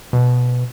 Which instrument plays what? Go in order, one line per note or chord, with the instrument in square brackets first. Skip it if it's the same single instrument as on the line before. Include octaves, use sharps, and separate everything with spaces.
[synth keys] B2